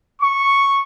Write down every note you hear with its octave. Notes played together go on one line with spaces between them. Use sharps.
C#6